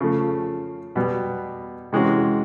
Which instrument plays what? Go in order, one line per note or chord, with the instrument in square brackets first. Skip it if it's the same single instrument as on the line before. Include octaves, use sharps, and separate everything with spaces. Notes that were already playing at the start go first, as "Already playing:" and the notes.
[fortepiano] C#3 F3 A3
B2 G3 B3
C3 E3 G#3 C#4 F#4